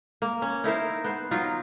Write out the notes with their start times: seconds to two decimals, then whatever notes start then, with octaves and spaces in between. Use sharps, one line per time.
0.22 A#3
0.42 C#4
0.64 D#4 E4 A#4 C5
1.04 B3 C5
1.31 F#3 D#4 F4